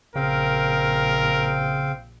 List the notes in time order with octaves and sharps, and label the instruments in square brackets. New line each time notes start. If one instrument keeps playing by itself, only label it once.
[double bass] A#1 [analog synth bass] C#3 [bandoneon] C4 F5 G5 [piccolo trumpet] A#4